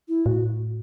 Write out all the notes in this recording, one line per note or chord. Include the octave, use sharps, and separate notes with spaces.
E4
A2 F#4